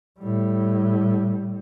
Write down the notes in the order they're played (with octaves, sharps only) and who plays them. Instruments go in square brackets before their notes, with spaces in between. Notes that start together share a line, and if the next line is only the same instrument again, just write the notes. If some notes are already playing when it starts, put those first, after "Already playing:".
[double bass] A2 G3